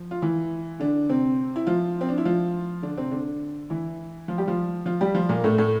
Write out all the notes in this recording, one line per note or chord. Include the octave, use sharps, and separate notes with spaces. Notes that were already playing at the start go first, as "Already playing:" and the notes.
Already playing: F3
F4
E3 E4
D3 D4
C3 C4
E4
F3 F4
C4
D4
E4
F3 F4
D3 D4
C3 C4
D3 D4
E3 E4
F3 F4
G3 G4
F3 F4
F3 F4
G3 G4
F3 F4
A#2 A#3
A2 A3
A2 A3